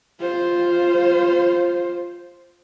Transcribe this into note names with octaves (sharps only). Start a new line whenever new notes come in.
F4 C5